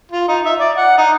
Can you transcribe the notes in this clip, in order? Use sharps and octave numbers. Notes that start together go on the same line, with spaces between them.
F4
D#4
E5
D5
F#5
D#4